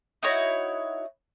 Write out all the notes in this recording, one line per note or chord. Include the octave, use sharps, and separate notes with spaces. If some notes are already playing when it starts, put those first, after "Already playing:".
D#4 E4 F#4 C#5